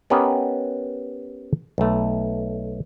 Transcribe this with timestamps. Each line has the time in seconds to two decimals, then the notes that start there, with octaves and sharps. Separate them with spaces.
0.10 B3 C#4 G4 A#4 B4 D#5
1.78 B1 A3